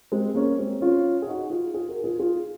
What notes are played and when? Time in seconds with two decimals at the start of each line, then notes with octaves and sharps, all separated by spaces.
0.12 G#3 C4
0.35 A#3 C#4
0.58 G#3 C4
0.81 C#4 F4
1.22 G#4
1.27 D#4 F#4
1.50 F4 G#4
1.74 F4 G#4
1.89 F#4 A#4
2.04 F4 G#4
2.20 F4 G#4